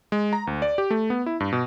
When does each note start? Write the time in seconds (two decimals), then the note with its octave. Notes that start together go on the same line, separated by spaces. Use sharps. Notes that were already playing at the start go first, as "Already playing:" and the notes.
0.12 G#3
0.33 A#5
0.47 D2
0.62 D5
0.78 G4
0.91 A3
1.10 B3
1.26 E4
1.40 G2
1.52 B2